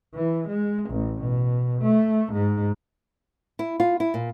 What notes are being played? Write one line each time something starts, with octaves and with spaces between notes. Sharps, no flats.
E3
G#3
A1
B2
A3
G#2
E4
F4
E4
A#2